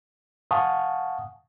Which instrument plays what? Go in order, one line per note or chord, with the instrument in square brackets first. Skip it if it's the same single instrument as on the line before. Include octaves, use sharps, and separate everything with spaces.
[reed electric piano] F5 F#5 G#5 A5 C#6 D#6